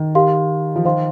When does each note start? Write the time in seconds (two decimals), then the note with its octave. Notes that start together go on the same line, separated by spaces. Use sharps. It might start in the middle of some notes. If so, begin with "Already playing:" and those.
Already playing: D#3
0.15 G4 A#4 F5 C6
0.76 F3
0.85 D#3 C5 F5 C6